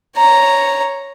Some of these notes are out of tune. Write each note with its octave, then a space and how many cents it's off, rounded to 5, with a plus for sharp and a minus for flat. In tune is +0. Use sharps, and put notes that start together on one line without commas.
C#5 -5 A#5 +0